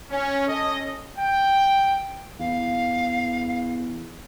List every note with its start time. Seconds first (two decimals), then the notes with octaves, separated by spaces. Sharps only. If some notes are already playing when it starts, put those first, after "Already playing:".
0.11 C#4
0.47 C#4 A4 D#5
1.18 G5
2.39 E2 F5